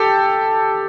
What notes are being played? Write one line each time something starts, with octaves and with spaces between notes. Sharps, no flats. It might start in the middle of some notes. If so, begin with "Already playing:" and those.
Already playing: G4 A4